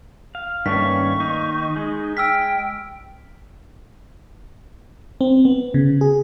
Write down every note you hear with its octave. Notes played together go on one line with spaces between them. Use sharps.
F5
G2 D#3 A3 A#3 C#4 C#5 C#6 B6
D#4
G#3
G5 E6 F6 B6
C4
B3
C#3
G#4